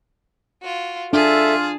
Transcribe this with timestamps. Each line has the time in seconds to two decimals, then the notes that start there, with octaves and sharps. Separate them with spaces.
0.61 F4 F#4
1.13 D4 F4 G#4 A4 E5 A5